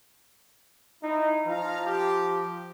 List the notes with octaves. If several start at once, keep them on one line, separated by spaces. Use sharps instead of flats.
D#4 E4
F3 F5 A#5
G4